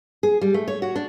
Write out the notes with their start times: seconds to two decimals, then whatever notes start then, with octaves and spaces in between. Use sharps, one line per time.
0.23 G#4
0.42 G3
0.54 A3
0.68 C#5
0.82 F#4
0.96 D4